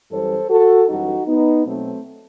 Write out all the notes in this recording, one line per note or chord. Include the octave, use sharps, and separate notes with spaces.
F#2 E3 G3 A4 C5
F#4 A4
F#2 E3 G3 D#4 F#4
B3 D#4
B2 F#3 A3 C4